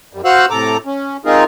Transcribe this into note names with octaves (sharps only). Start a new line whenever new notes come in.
F#2 G3
F#4 C5 F5 F#5 E6 F#6
A2 C3 A4 A#5 D6
C#4
G#3 C4 D#4 F4 G#4 A#4